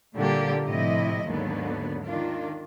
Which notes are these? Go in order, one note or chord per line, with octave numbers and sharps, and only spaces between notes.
A#2 D3 G3 A#3 G4
A2 C3 F3 E4 D#5
D#2 G#2 D3 F#3 B3
D#3 D4 F4